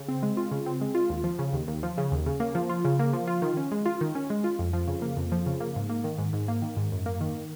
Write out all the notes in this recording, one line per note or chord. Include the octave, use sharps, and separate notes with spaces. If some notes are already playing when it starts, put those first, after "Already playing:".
Already playing: C#3
C4
G#3
F4
C#3
C4
G#3
F4
D#2
F3
C#3
D#2
D#2
F3
C#3
D#2
C#3
A#3
F3
F4
C#3
A#3
F3
F4
D#3
C#4
G#3
F4
D#3
C#4
G#3
F4
F2
F3
C#3
A#3
F2
F3
C#3
A#3
G#2
A#3
D#3
G#2
G#2
A#3
D#3
G#2
F#2
A#3
D#3